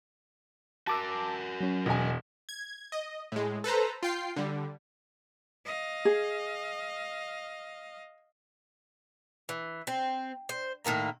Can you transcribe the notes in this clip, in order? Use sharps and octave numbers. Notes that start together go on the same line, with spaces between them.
F#4 A#4 A5 D6 E6
F#3 C#4
E1 A#4 D#5 G#5
G#6
D#5
A2 G#3
A4 B4 C5 A#5
F4 G5 C7
D3 G3
D#5 F5
G#4
E3
C4
C5
A2 D#3 A#3 A#5